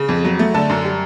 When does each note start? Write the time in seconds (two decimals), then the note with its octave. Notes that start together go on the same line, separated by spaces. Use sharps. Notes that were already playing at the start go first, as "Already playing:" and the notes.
Already playing: C#3
0.09 F2
0.24 F#3
0.39 A3
0.54 D3 A5
0.69 F#2
0.84 G3